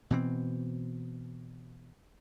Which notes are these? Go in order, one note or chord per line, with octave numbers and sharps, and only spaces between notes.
B2 E3 C4